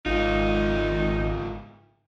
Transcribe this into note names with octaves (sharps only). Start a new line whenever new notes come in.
G#1 G#2 D#4 F4